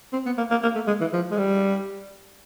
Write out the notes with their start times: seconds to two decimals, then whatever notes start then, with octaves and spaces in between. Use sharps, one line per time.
0.13 C4
0.26 B3
0.38 A#3
0.51 A#3
0.63 A#3
0.75 A3
0.87 G#3
1.01 E3
1.13 F3
1.31 G#3
1.38 G3